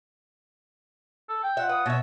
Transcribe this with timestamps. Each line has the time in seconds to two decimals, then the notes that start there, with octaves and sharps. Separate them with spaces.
1.29 A4
1.43 G5
1.57 F4 E5 F#5
1.69 B4 D#6
1.86 B2 C#5 E5